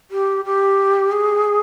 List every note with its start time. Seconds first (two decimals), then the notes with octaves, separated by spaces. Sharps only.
0.11 G4
0.45 G4
1.12 G#4